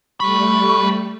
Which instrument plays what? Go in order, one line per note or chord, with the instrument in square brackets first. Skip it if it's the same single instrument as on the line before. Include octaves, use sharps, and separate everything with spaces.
[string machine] G3 A3 [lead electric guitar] C5 B5 [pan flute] C#6